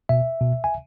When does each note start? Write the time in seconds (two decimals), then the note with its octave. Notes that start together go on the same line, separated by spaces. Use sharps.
0.09 B2 E5
0.41 B2
0.64 G#5